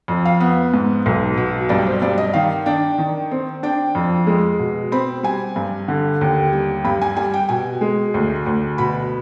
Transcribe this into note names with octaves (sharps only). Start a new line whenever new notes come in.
F2
F5
B3
G#2
B1
B2
G2 D5
C5
G2 D5
D#5
D#3 F5
D4 G5
D#3
C4
D4 G5
F2
G#3
B2
C4 B5
G3 G#5
G2
D3
D#2
G3
G2 B5
G#5
G3 G#5
G5
B2 G#5
G#3
D2
D2
B2 B5